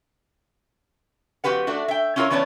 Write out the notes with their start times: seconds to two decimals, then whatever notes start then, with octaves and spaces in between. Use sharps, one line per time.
1.44 F2 F#4 G4 B4 F#5
1.67 A3 D4 F#4
1.88 E5 G5
2.16 C#4 E4 F4 G#4 A#4 C#5
2.31 E3 B3 C#4 C#5 D5 A5